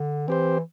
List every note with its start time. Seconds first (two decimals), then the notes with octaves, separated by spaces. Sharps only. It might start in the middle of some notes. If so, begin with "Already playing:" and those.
Already playing: D3
0.28 E3 C4 G4 C5